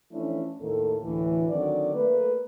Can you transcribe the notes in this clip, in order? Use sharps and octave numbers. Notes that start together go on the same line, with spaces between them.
E3 F3 A3 C#4 D4 E4
D#2 A2 D#3 A#3 A4
D2 A2 E3
D3 D#3 F#3 C4 D5
A3 A#3 B4